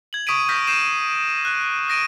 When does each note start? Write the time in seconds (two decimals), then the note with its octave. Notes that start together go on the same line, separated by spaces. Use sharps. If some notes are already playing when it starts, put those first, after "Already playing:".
0.13 G#6 F#7
0.27 C#6 D#6 B6 D7 D#7
0.48 C#6 F6 G6 G#6 A#6 B6
0.67 G6 C7 D#7 E7
1.45 F#6
1.88 D#6 G6 A#6 D7 D#7